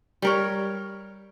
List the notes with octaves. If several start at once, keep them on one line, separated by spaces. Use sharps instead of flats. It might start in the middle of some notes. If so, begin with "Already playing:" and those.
G3 A#4 C#5